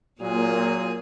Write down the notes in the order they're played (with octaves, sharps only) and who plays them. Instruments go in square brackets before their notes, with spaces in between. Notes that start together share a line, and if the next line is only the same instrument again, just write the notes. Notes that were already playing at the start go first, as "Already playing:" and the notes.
[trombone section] A#2 F#3 [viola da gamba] A#3 G#4